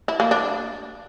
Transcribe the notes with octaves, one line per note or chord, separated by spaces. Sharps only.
E4
A#3
D4